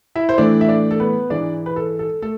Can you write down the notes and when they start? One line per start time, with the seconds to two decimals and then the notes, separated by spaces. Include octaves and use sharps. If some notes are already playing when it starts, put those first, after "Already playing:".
0.16 E4 E5
0.29 C5
0.38 A2 E3 A3 D4 D5
0.61 E5
0.69 D4 D5
0.91 A4
1.00 B3 B4
1.30 G#2 E3 G#3 D4 D5
1.66 B4
1.76 A4
1.99 A4
2.22 A3 A4